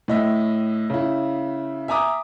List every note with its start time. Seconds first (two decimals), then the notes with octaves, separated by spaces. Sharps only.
0.08 A2 D#5 E5
0.90 C#3 E4
1.88 E5 G#5 A#5 D6 D#6